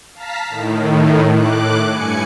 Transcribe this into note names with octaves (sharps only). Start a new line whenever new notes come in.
F5 A5 A#5 B6
A2 D#3
A2 D6 F#6
G2 G#5 C#7